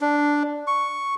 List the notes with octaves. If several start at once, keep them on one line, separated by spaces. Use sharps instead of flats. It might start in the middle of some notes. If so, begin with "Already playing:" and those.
D4
C#6